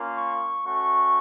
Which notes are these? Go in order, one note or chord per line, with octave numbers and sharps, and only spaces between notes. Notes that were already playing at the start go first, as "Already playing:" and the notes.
Already playing: A#3 C#4 F4
C#6
A3 C#4 F#4 C#6